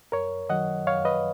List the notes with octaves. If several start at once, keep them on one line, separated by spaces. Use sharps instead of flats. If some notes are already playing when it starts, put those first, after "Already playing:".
F#2 A#4 C#5
D#3 F#3 D#5 F#5
F#2 C#5 F5
B4 D#5